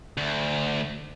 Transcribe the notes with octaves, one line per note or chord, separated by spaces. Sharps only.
D2